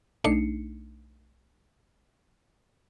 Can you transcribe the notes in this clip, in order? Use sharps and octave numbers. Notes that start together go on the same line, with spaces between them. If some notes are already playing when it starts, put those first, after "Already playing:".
B1 A3 D4 D#4 C7 C#7